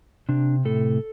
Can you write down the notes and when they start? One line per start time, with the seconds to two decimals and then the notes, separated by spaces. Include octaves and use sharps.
0.29 C3 D4
0.65 A2 A4